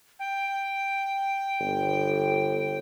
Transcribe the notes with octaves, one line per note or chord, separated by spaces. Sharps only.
G5
G1